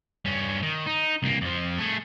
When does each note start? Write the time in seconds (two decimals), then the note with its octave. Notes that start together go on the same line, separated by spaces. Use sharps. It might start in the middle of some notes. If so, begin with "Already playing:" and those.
0.25 G2 C#4
0.63 D#3
0.86 D#4
1.23 C2 A#3
1.41 F2 F3
1.78 A3 G#4